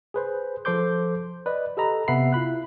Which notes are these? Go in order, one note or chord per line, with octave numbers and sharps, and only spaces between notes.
G#4 B4 C5
F3 A4 C5 C6 D6 G6
B4 D5 D#5
G4 A4 D#5 A#5 B5
C3 B3 E5 F#5 B5 C7
E4 F4 B5 F#6